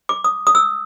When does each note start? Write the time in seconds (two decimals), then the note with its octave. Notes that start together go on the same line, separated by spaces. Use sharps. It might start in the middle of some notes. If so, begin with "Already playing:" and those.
0.09 D6
0.24 D#6
0.47 D#6
0.55 E6